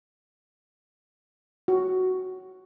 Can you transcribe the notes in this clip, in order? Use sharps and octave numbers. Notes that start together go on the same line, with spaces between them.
F#4